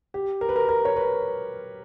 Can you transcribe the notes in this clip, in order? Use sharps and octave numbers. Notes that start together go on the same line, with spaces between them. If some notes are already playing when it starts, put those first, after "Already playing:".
G4
A#4
B4
A#4
A#4
C#5
B4